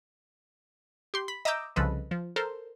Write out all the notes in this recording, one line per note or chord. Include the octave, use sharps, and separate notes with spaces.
G4 C6
B5
D#5 E5 A#5 D6 E6 G6
C2 C#3 F3 A4 B4 D#5
F3
A4 A#4 C5